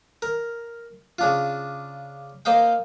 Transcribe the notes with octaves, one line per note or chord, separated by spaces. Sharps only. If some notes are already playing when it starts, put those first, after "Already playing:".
A#4
C#3 D4 F4
A#3 C5 D#5 F5 G5